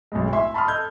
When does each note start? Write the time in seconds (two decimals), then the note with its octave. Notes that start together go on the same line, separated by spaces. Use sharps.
0.12 B1 F#2 A2 G#3
0.32 E4 E5 C6
0.54 A5 B5 C6 D#6 F6
0.67 A4 D#5 G6 G#6